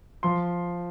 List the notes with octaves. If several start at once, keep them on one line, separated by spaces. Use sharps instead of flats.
F3 C6